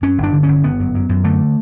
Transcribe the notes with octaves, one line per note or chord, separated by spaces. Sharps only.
F#2 C#4
G1
D4
D3
G1 C#4
G1 B3
F#2
F#2
F#2
D3 A3